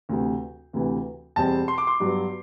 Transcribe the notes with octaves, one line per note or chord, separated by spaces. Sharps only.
D2 C3 E3
D2 C3 E3
E2 B2 G3 C4 A5
C6
D6
C6
G2 F#3 B3